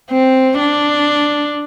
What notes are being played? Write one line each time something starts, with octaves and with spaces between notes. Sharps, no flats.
C4
D4